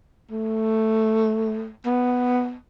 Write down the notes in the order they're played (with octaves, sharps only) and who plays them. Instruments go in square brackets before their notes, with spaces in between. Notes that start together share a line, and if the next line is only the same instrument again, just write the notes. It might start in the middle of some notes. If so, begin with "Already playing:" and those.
[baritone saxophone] A3
B3